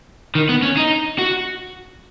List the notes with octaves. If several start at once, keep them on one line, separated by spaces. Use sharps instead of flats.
D#3
B3
C#4
D#4
F#4